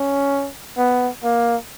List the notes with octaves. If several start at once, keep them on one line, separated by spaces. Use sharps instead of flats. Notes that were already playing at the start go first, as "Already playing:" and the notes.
Already playing: C#4
B3
A#3